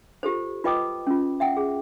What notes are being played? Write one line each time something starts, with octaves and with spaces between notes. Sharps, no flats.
F4 G4 A4 C5
F4 B4 D#5 G5 D6 D#6
C#4 F4
E5 F#5 G5
G#4